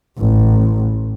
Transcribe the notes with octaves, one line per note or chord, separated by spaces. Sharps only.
A1